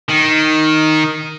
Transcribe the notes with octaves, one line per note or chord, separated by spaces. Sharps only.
D#3